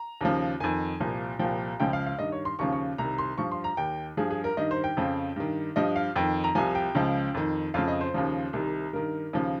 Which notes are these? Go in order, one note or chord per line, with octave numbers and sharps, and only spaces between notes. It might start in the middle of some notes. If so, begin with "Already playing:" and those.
Already playing: A#5
D#2 C#3 F3
F2 D#3 G#5
C2 A#2 F3
C2 A#2 F3 G5
C#2 C#3 F3 G5
F5
F5
G2 D#3 D#5
C#5
C6
D#2 C#3 F3 C#6
C#6
C2 C3 D#3 A#5
C6
G2 F3 C#6
C6
A#5
D#2 D#3 G5
G2 F3 G#4
G#4
A#4
G2 D#3 D#5
C5
G5
F2 C#3 F3
G2 D#3
G2 F3 D#5
F5
F2 D#3 G5
A#5
C2 C3 F3 G#5
G5
C#2 C#3 F3
F2 D#3
F2 C#3 F3 F5
D#5
C5
D#2 C#3 F3
C2 C3 D#3
G2 D#3 A#4
D#2 C#3 F3